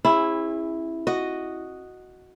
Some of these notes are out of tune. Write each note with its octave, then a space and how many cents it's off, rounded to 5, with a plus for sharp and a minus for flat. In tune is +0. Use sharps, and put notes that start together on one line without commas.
C#4 -45 E4 +0 G#4 -30
F#4 +0 D#5 -5